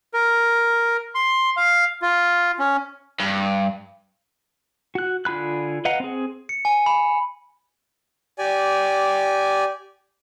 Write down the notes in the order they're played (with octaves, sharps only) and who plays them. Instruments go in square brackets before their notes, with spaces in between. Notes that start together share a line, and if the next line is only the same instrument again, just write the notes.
[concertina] A#4
C6
F5
F4
C#4
[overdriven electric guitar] G2
[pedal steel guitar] F#4 F#6
D3 F4 G#4 B5 F#6
B4 D#5 F5 F#5 A#5
C4 G#4
[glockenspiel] C#7
G#5
B5
[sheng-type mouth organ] G4 D5 G#5